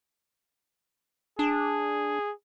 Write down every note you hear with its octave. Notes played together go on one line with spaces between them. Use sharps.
D4 G#4